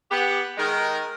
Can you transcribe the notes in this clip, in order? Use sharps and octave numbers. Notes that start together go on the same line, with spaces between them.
B3 G4 F#5
D#3 G#3 A#4